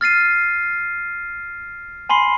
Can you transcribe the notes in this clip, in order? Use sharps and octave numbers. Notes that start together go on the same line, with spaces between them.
F6 A6 C7 D#7
G#5 B5 C6 C7